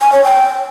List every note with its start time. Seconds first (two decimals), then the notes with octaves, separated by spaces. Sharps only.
0.01 G#5
0.12 C#5
0.24 G5